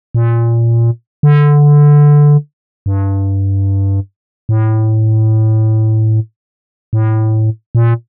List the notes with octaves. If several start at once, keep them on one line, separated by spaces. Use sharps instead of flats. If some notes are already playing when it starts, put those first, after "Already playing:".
A#2
D3
G2
A2
A2
A#2